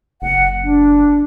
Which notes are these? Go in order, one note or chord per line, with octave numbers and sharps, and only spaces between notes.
F#1 F#5
D4